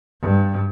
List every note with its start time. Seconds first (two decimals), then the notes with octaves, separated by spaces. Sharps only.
0.22 G2